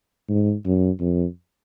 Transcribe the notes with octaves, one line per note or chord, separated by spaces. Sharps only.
G#2
F#2
F2